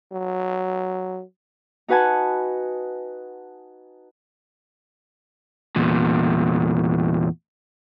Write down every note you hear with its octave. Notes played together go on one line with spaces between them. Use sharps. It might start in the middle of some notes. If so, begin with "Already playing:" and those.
F#3
D#4 F#4 B4 F#5 G#5 A5
E2 A#2